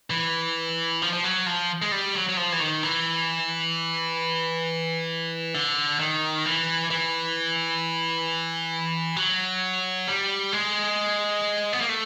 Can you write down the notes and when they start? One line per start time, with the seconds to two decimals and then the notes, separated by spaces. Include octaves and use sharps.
0.10 E3
1.02 F3
1.13 F3
1.24 F#3
1.46 F3
1.82 G#3
1.92 G3
2.15 F#3
2.29 F#3
2.37 F3
2.52 E3
2.60 D#3
2.83 E3
5.54 D3
5.99 D#3
6.46 E3
6.91 E3
9.16 F#3
10.07 G3
10.53 G#3
11.73 B3
11.81 A#3
11.89 A3